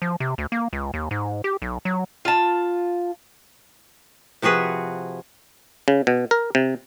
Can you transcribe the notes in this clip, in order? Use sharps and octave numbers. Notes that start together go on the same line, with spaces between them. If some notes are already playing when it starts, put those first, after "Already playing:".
F3
C3
D2
A#3
C#2
D#2
G#2
G4
B1
F#3
F4 A5
C3 F3 F#4 G#4 B4
C#3
B2
A#4
C3